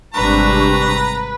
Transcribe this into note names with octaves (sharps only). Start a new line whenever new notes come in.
G#1 C3 G3 D4 B4 A#5 C#6